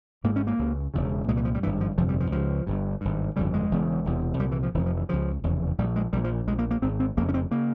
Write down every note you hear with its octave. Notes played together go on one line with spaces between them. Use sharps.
G#1 G#2 A#3
C#4
A#3
C#2 C#3
E1 E2 C#3
C2 A#2 G#3
E3
F3
G3
G#1 G2 E3
F3
G1 F2 C3 F3
G3
F3
C#2 C#3 F3
G1 G2
G#1 G2
G1 F2 C#3 G3
G#3
E1 E2 C#3
E1 E2 C3
C2 A#2 G3
E3
F3
F1 F2 C#3 E3
F3
E3
C#2 C#3 F3
F1 E2 C#3
A#1 A#2 G3
G#3
A#1 A#2 G3
F3
A#1 A#2 G#3
A#3
A#3
G#1 G#2 C4
C4
F1 F2 C#3 A#3
C#4
C4
C#3 A#3